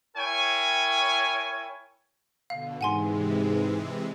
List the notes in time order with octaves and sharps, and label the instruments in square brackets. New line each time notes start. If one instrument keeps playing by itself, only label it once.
[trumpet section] E4 A#4 C#5 G5 G#5
[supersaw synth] B2 D3 [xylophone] F5
[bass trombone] G#2 [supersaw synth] C3 E3 G#3 [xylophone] F#5 G#5 C6